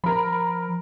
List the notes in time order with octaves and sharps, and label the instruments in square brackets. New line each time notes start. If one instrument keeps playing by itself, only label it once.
[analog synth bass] F3 [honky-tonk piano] A#4 B5